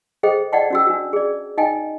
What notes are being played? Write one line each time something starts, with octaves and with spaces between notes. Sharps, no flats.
G#4 A4 C5 D#5 G5
D5 D#5 F#5 G5 A5
C#4 F#4 E6
D4 F#4
G#4 D5
D#4 D#5 G5 G#5